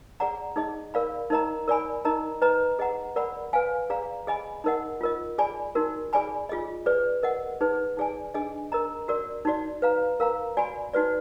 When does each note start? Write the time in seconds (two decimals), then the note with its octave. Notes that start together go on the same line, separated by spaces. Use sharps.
0.20 G#4 D5 F#5 A#5
0.56 D#4 G#4 D#5
0.94 A#4 D5 F5 B5
1.30 D#4 A#4 D#5 A#5
1.68 A#4 D5 G#5 B5
2.05 D#4 A#4 D#5 A#5
2.42 B4 D#5 A#5
2.79 G#4 D#5 F#5 A#5
3.16 A#4 D5 F#5 B5
3.53 B4 F5 G#5
3.90 G#4 D5 F5 A#5
4.27 G#4 D#5 G#5 B5
4.64 D#4 A#4 D#5 F#5
5.01 F4 A#4 D#5
5.38 G#4 D5 G#5 B5
5.75 D#4 F#4 A#4
6.13 G#4 D5 G#5 B5
6.49 F4 G#4 D#5
6.86 G#4 B4 D5
7.23 A#4 D#5 F#5
7.61 D#4 G#4 B4
7.97 D#4 G#4 D5 G#5
8.34 D4 G#4 D#5 G#5
8.72 A#4 D#5 A#5
9.08 F#4 A#4 D5
9.45 D#4 F#4 D5
9.82 B4 F5 A#5
10.20 A#4 F5 A#5
10.57 F#4 D5 G#5 B5
10.94 D#4 F#4 B4 D5